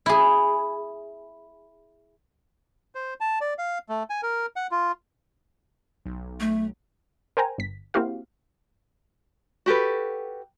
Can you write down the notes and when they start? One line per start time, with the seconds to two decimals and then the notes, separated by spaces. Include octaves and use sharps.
0.06 E4 G#4
2.95 C5
3.20 A5
3.41 D5
3.58 F5
3.89 A3
4.10 G#5
4.23 A#4
4.56 F#5
4.71 F4
6.06 B1
6.40 A3
7.37 A#4 C5 G5 G#5 A#5
7.58 G1 B6
7.94 A#3 C4 E4 F#4 G4 F5
9.66 F#4 G4 A4 B4